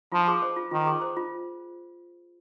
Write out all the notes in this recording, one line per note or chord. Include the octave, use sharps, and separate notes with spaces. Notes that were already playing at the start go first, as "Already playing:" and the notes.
F3 F4
G#4
C5
F4
D#3 F4
G#4
C5
F4